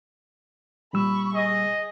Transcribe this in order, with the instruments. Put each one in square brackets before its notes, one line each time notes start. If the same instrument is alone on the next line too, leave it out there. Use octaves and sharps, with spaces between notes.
[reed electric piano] A#2 G3 E6 [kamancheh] B5 C#6
[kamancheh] G#4 [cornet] D#5